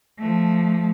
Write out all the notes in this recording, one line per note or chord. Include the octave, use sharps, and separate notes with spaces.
F3 A3